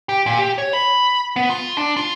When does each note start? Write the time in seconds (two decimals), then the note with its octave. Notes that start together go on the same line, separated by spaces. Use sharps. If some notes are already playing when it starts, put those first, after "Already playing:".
0.09 G4
0.26 A#2
0.39 G4
0.58 C#5
0.73 B5
1.36 B3
1.50 F4
1.78 D4
1.97 F4